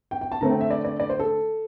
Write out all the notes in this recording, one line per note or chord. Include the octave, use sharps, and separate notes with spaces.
G5
G5
A5
D3 A3 C4 A#5
G5
E5
D5
D5
D5
C5
A4